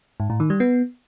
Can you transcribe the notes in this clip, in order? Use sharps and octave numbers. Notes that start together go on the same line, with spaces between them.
G#2
A2
D#3
G3
B3